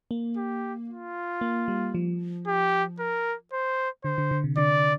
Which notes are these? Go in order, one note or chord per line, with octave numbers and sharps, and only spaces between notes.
A#3
G4
F4
A#3
G3
F3
G4
A#4
C5
D3 C5
D3
D3
C3
D3 D5